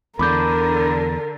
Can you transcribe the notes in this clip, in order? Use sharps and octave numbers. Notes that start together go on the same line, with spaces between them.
E2 D3 A#4 B5 D6 G6